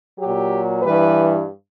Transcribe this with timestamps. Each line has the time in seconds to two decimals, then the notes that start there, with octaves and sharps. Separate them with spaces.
0.19 A#2 F#3 G4
0.83 G2 E3 G3 B4